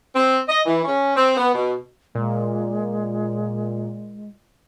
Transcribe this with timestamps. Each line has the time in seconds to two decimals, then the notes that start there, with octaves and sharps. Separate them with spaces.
0.16 C4
0.48 D#5
0.65 E3
0.84 C#4
1.15 C4
1.37 B3
1.54 B2
2.15 A#2 G#3